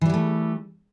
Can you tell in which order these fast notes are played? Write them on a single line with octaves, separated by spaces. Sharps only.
E3 G3 F#3 A3